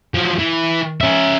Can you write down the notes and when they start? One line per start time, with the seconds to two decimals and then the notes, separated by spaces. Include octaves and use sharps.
0.14 F3 F#3
0.39 E3
1.01 C#4 E5